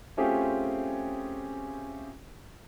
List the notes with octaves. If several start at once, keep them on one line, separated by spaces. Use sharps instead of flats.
A3 C4 C#4 F4 G4 G#4